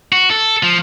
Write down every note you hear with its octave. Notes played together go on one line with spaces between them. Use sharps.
F#4
A4
F3